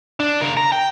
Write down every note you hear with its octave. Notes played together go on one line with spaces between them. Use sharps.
D4
C#3 A#4
A#5
G5